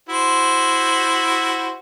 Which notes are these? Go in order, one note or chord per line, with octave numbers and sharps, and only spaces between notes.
E4 F#4 C5